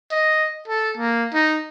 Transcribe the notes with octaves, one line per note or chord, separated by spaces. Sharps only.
D#5
A4
A#3
D#4